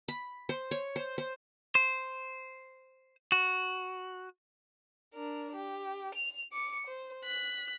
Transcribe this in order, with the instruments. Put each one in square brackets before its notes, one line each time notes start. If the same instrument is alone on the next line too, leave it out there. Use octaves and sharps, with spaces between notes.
[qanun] B5
C5
C#5
C5
C5
[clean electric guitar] C5
F#4
[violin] D4 A#4
G4
F7
D6 C#7
C5
F#6 B6